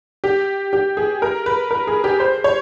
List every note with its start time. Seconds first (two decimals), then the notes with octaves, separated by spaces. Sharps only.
0.24 G4
0.73 G4
0.97 G#4
1.22 A#4
1.46 B4
1.71 A#4
1.87 G#4
2.04 G4
2.20 C5
2.44 C#5